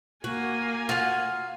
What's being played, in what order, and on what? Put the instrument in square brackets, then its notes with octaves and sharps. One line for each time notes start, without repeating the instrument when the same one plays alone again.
[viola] A#3 G#5 [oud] F#4
[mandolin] F4 [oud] F#4 F5